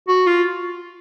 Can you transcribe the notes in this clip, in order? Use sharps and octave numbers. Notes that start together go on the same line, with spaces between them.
F#4
F4